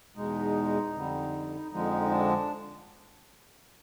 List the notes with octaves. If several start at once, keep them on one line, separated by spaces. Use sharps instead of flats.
E2 B2 G#3 D#4
F2 D3 G3
F2 D3 F3 G#3 D#4
D4